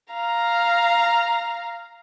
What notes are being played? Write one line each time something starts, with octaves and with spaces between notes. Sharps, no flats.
F5 A#5